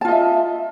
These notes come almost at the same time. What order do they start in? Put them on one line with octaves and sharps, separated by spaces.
A5 F4 D#5 E5